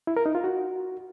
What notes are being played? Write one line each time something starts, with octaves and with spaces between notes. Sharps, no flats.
E4
A#4
D#4
F4
F#4